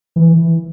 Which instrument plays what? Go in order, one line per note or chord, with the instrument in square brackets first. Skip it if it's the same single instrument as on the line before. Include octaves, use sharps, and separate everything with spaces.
[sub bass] E3